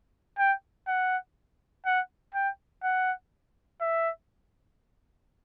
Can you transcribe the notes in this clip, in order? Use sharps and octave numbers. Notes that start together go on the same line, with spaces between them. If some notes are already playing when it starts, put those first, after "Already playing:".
G5
F#5
F#5
G5
F#5
E5